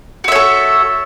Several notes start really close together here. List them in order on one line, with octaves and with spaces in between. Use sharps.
F#4 E5 C#5 A4